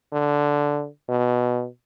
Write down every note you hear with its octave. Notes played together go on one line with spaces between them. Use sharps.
D3
B2